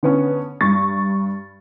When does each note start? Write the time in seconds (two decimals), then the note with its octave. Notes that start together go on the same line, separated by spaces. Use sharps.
0.03 D3 B3 C#4
0.61 G2 C#6 A6